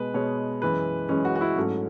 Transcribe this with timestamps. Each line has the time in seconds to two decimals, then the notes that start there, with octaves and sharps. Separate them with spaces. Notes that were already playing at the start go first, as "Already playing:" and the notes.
Already playing: B2 G#3 B4
0.14 B2 G#3 C#5
0.62 F#2 E3 G#3 B4
1.09 F#2 E3 G#3 C#4
1.25 F#4
1.36 F#4
1.41 E4
1.56 G#2 F#3 A3 C#4